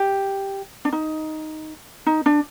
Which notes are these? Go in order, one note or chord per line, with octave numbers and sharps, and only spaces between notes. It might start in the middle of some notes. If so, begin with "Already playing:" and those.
Already playing: G4
D4
D#4
D#4
D4